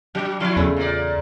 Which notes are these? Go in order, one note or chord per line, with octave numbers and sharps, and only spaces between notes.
F#3 D4 G4
F3 E4 A#4 F5
E2 C#3 A3
A#2 D5